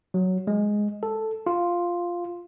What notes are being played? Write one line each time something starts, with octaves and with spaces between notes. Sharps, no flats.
F#3
G#3
A4
F4